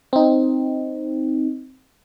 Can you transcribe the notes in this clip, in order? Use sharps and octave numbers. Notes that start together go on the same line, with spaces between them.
C4 D#4